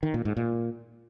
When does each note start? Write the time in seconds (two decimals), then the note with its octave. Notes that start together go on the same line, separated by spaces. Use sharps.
0.03 D#3
0.14 A#2
0.25 G#2
0.37 A#2